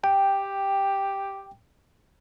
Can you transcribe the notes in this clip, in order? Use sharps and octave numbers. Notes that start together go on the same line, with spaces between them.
G4 G5